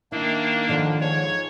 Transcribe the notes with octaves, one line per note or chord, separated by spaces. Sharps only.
D#3 A#3 D4 E4
D3 D#3 F3 C5
G#2 C#5